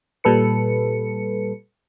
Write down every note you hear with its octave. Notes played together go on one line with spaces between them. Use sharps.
A#2 G3 A4 B4 C#7